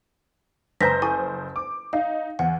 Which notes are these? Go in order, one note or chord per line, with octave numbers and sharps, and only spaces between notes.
F#1 B4 C5 G#5 A#5 G6 A#6 B6
E4 A4 G#5 C#6
D6
D#4 F5
E2 F#5